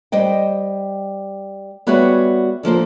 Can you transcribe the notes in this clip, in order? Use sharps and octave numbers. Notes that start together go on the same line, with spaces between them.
G3 C5 D#5 G5
G3 B3 F#4 G#4 C#5 E5
D3 F3 A#3 C5